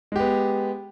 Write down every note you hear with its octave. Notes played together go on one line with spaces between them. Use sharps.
G#3 B3 G4